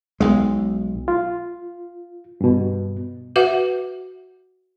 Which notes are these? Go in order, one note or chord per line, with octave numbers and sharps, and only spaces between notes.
B1 G#3
F4
G2 B2
F#4 B4 E5 F#5